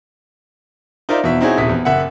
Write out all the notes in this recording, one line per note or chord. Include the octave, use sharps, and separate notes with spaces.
D#4 F4 A#4 C5 D5 E5
E2 B2 E5 B6
C4 D#4 E4 F#4 G#4 C#5
D#1 C3 E4 D#6 B6
E2
F#1 E5 F#5